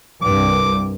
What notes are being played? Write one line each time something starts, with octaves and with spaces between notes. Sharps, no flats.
C2 G2 D6